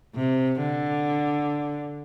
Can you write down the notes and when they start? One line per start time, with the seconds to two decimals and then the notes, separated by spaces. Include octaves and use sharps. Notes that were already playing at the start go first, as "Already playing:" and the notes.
0.15 C3
0.60 D3